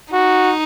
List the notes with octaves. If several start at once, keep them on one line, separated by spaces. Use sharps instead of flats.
D#4 F#4